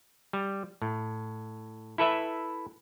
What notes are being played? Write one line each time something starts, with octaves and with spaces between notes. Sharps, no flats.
G3
A2
E4 A4 B4 E5